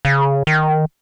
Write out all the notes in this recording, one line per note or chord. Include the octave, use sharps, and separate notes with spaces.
C#3
D#3